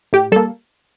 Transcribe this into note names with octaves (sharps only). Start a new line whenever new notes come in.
A2 G4
G3 A#3 A4